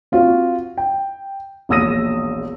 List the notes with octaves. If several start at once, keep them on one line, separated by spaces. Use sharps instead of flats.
C4 F4 F#4
G5
E1 A#1 D#6 E6 A#6 D#7